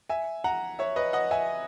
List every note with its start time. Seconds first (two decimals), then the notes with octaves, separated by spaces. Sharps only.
0.10 E5 G#5
0.44 F#5 A#5
0.79 C#5 E5
0.96 B4 D#5
1.13 D#5 F#5
1.31 E5 G#5